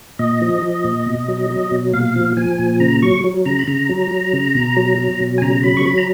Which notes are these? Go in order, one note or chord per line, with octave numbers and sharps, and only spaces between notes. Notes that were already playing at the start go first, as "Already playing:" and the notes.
A#2 D#5
F3
F3
A#2
B2
F#3
F#3
B2
A#2 F5
F3
F3 G#5
A#2
C#3 A#5
F#3 C#6
F#3
C#3 A#5
B5
C#3 A#5
F#3
F#3
C#3
B2
F#3
F#3
B2
G#5
C#3 A#5
F#3 B5
C#6
F#3 B5
A#5